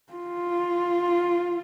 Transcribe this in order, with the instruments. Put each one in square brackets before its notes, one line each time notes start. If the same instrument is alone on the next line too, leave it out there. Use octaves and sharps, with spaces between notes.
[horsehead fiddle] F4